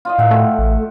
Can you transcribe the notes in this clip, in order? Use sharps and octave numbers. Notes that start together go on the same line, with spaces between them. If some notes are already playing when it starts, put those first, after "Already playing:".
F4 D5 D#5
A2 E5 F#5 G5
A3
A1